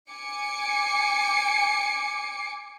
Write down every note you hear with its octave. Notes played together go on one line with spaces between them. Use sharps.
G#5 D6 C#7